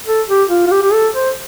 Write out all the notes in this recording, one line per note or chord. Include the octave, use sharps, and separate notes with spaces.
A4
G4
F4
F4
G4
G4
A4
C5